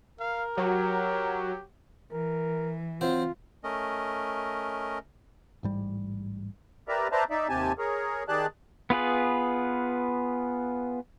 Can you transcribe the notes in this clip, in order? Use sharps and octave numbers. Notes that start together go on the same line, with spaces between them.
A#4 F5
F#3 G4
E3 A#4
F#3 C4 F4 C5
A3 C#4 A#4 D#5
A1 G#2 G3
G4 A#4 B4 D5 E5 A#5
B4 C5 D5 E5 A5 A#5
D#4 D5 E5
D#2 C3 C4 G4 G#5 A5
G#4 A#4 C#5
D#3 G4 G#4 D5 A5 F#6
B3 F4 G#4 B4